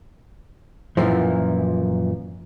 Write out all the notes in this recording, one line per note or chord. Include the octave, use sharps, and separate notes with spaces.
F#2 A#2 E3 F3